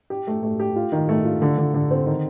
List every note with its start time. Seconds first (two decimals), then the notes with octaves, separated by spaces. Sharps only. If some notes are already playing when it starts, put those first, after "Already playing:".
0.10 G4
0.27 A3
0.43 A3
0.60 G4
0.76 F4
0.92 D#3
1.09 A3
1.25 F4
1.42 D3
1.58 D3
1.74 D3
1.91 C4
2.07 D#3